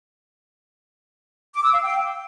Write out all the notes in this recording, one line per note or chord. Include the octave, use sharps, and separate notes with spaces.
D6
E6
F5
G5